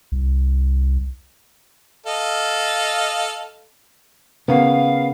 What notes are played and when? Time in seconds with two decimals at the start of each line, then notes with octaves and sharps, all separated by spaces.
0.12 C2
2.06 A4 D#5 F5
4.48 C#3 A#3 B3 F5